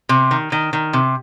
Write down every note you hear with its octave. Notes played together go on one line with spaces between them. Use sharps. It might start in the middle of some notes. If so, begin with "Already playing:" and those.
C3
D#3
D#3
D#3
C3